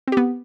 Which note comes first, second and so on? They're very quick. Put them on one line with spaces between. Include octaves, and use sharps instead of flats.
C4 G4 B3